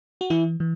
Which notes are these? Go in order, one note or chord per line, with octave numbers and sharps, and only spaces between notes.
F#4
E3 E4
E3